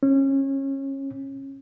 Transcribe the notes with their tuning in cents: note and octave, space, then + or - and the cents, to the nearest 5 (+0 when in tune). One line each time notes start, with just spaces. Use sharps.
C#4 -25